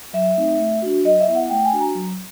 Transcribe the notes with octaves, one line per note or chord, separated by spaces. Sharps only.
F#3 E5
A3 C4 D#4
A3
D4 F#4
F#3 D#5
E5
B3 E4
F#5
A3 G5
G#5
D4 F#4
A#5
F#3